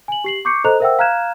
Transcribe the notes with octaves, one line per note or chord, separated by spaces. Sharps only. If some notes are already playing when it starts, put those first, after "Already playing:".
G#5 F#7
G4 C7 F#7
C#6 D6 G6 C7 C#7
A4 C5 D#5 A#5 F#6 F7
A#4 C5 E5 F#5 G5 E6
F5 A#5 F6 F#6 G#6 E7